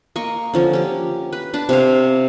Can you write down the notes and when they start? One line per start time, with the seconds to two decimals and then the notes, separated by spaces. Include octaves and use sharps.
0.16 A#3 D#5 C#6
0.54 D3 F3 C#4
0.73 C#4 G4
1.33 B4
1.53 D4 B4
1.69 C3 C#5 F5